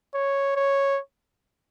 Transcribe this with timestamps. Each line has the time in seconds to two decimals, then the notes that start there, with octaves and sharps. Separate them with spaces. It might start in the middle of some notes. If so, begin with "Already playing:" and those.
0.15 C#5
0.56 C#5